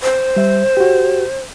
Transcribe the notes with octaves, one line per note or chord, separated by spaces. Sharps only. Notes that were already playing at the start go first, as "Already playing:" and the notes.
C5
G3 E5
F#4 G4